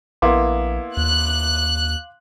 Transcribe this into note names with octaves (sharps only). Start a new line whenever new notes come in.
A#1 A#3 B3 E4 F5 C6 D6
D#2 F#6